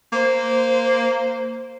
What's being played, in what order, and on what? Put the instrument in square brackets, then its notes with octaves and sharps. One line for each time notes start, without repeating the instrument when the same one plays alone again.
[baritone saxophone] A#3 [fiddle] C5